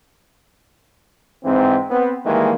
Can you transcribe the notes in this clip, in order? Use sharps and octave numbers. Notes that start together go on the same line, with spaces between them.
G#2 E3 C4
B3 C4
D#3 E3 G3 G#3 A#3